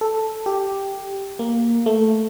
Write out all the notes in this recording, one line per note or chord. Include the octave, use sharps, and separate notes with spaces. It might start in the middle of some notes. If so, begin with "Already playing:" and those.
A4
G4
A#3
A3